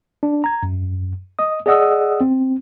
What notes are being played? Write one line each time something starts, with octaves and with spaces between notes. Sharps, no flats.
D4
A#5 G#6
F#2
D#5 D#6
G#4 D5 D#5 F#5 D#6 E6
C4